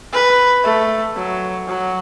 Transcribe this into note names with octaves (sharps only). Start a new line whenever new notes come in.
B4
A3
F#3
F#3